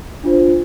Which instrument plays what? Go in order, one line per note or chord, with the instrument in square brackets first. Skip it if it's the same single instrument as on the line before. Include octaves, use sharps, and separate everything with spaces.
[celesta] D4 F4 C5